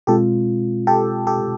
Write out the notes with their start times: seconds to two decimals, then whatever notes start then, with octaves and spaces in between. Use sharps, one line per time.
0.07 B2 G#3 C4 F4 G4 A4
0.87 G4 A4
1.27 G4 A4